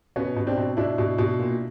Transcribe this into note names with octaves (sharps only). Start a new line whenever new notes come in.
B2 B3 C#4
B2
C4 D4
B2
B2 D4 E4
B2
B2
A#2